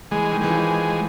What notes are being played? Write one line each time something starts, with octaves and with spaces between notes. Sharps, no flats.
E3 G#3
D#3
E3 G#3
F3